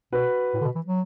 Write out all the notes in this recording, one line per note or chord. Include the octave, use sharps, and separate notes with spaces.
B2 F#4 B4
A2
D3
B2
E3
F#3